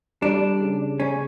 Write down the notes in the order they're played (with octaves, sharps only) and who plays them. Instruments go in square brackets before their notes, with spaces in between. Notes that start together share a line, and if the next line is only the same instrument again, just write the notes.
[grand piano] G3 [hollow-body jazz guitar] D4
[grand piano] C#3
[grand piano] C#3 [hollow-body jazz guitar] C#4